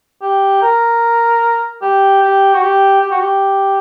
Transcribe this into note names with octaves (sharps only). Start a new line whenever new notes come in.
G4
A#4
G4
G4
F#4
G4
G4
F#4
G4